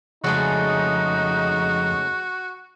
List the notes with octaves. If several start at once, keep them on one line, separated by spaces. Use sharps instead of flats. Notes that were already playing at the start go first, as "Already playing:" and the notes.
F2 C#3 G#3 A3 D#4 F#4